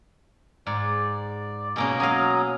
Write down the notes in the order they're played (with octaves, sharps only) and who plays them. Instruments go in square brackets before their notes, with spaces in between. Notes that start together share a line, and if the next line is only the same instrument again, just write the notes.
[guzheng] G#2 [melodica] D5
[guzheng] B2 A#3 C#4 [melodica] G#4
[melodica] F#3 A#5 D#6 [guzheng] F5 G#5